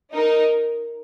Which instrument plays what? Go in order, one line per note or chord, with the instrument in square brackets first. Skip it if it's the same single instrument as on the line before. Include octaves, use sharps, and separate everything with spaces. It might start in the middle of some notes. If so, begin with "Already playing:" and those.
[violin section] D#4 [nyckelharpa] A#4